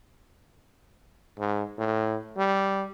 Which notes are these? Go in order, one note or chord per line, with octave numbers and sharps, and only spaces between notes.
G#2
A2
G3